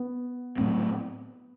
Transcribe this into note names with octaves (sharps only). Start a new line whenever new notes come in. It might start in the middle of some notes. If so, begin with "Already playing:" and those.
Already playing: B3
A2 F#3 A3 C4